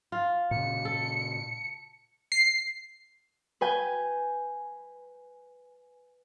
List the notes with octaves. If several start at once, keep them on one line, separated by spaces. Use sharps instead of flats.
F4
A#2 C#3 C#7
A4
C7
B4 G#5 G6